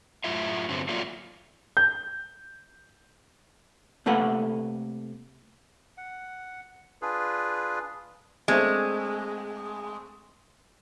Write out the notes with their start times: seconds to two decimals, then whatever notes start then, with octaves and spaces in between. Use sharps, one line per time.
0.24 F#2 A2 F4 E5
0.68 G2 D3 F#3 C4
0.89 F#3 A3 A#3 F4 D5 E5
1.77 G6
4.06 C3 A3 A#3 A4 B4 F#5
5.97 F#5
7.02 D4 F4 G#4 B4
8.48 G#3 A3 C4 D4